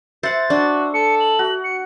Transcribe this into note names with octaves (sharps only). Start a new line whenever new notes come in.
C5 E5 F#5 A6
D4 F#4
A4 C#7
F#7
F#4
C#7